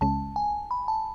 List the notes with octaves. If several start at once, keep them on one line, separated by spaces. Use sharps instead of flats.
C#2 C#3 G#3 C#4 A5
G#5
B5
A5